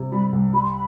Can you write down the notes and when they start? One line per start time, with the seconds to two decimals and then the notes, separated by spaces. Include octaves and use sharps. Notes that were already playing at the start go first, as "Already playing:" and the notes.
Already playing: C3 G3
0.12 G3 B5
0.33 C2
0.53 G3 B5
0.62 C6
0.70 B5